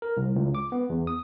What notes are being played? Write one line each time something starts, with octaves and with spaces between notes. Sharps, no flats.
A#4
C2
C#2
D6
B3
E2
D#6